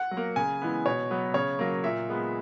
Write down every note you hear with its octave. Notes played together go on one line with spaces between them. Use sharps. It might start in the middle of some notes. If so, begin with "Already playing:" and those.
Already playing: F#5
F#3
A#3
C#3 G#5
E3 G#3 B3
B2 C#5
F#3 B3
C#3 C#5
F#3 A#3
A#2 E5
G#3 B3